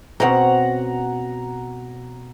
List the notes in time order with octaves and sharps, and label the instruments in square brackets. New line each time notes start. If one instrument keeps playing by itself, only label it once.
[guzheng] B2 C4 C#4 [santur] F#5 A#5